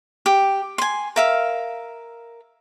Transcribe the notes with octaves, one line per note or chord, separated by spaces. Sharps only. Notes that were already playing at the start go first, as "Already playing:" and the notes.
G4
G#5 C6
A#4 E5 F5